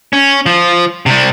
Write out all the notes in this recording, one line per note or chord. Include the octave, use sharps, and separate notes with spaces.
C#4
F3
C3 G3